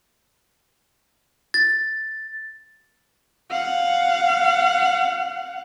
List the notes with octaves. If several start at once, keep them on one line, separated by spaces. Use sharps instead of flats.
A6
F5 F#5